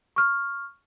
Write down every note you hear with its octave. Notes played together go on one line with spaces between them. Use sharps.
C#6 F6